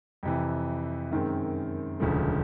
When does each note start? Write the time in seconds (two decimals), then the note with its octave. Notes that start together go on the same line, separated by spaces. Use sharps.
0.23 F2 C3 E3
1.11 F#2 D#3 G#3 C4
2.00 E1 D2 C#3 F3 A3